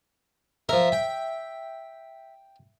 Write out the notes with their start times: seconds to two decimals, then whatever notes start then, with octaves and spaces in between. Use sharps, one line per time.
0.69 F3 A#4 E5
0.92 G5